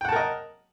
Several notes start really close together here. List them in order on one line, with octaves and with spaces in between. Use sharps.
G5 F#5 A5 A#4 D#5